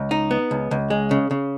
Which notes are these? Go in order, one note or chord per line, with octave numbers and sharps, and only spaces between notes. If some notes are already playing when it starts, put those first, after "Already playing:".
Already playing: C#2
D#4
B3
C#2
C#2
G#3
C#3
C#3